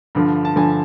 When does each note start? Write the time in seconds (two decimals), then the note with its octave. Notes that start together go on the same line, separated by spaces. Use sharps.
0.15 G2 D3 F3
0.45 A5
0.56 G2 D3 F3 G#5